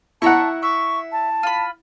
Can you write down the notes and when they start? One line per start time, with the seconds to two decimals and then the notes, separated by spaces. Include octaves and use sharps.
0.22 E4 E5 F#5 A5 A#5 C#6
0.63 E5 C#6
1.12 A5
1.43 F4 B5